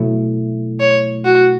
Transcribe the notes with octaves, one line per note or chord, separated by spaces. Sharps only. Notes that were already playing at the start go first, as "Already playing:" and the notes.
Already playing: B2 F#3 A3 E4
C#5
F#4